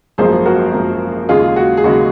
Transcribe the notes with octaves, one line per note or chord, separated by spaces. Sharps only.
G#1 F#2 F3 A#3 G#4 C5
F#4 A#4
G#1 F#2 F3 A#3
D#2 C#3 G#3 F4 G#4
F#4
G#4
D#2 C#3 G#3 F#4